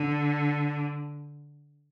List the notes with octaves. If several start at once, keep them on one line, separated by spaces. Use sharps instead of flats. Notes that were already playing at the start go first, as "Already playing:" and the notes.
Already playing: D3